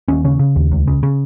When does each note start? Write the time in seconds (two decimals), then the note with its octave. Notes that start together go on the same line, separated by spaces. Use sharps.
0.08 D#2 C#4
0.25 C#3 C#4
0.39 C#3
0.56 D#2
0.72 C#2
0.88 C#3
1.03 C#3